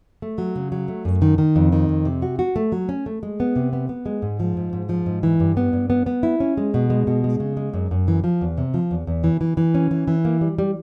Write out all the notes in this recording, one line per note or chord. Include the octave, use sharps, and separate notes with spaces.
A3
F#3
C#3
F#3
A3
F#2
D#3
D#3
F2
D#3
F2
C3
F#4
F#4
A3
F#3
C#4
A3
G#3
B3
C3
B3
B3
G#3
G#2
F3
G#2
G#2
F3
G#2
E3
G2
B3
G2
B3
B3
E4
C#4
G#3
B2
G#3
B2
G#3
C#3
G#3
F#2
F#2
E3
F3
E2
C3
F3
E2
E2
E3
E3
E3
C#4
E3
E3
A#3
G3
G3